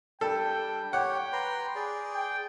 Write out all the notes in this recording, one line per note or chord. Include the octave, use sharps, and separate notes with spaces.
G3 D4 A4 G5
G4 C#5 F#5 G5
B4 A#5 C6
G#4 D5
G5